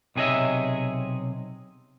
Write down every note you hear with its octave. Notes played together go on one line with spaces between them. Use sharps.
B1 C3 G#4 C#5 D#5 E5